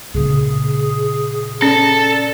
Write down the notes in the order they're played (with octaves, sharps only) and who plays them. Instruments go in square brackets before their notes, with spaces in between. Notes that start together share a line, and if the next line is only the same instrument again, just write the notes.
[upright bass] A#2 C#3 [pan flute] G#4
[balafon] C#4 [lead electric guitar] A4 [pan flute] D5